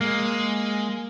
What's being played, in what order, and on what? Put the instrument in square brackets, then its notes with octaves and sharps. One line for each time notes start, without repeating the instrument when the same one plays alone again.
[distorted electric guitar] G#3 [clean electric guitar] A#3